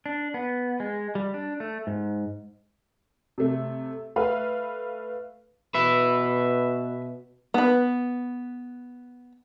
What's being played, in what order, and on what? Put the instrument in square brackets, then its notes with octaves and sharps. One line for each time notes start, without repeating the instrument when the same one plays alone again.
[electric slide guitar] D4
B3
G#3
G3
D4
A3
G#2
[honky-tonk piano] C3 A3
A3 B4 F5
[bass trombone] B2 [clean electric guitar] B4 E5
[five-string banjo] B3 B4